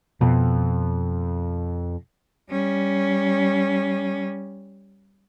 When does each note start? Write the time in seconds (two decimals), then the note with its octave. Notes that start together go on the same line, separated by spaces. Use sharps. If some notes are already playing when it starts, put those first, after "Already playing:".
0.21 F2 B2
2.50 G3 C#4